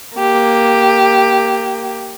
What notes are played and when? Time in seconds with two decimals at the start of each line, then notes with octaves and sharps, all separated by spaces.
0.17 A#3 G4